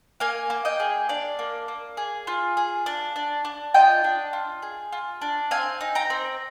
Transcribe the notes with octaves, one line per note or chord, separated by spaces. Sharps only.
A#3 F5 G#5
A#3
D#5 G5
G#4
D4 D5 F5
A#3
A#3
G#4
F4
G#4
D4
D4
D4
F4 D#5 G5
D4
F4
G#4
F4
D4
C4 F5 G#5
D#4
G5 A#5
C4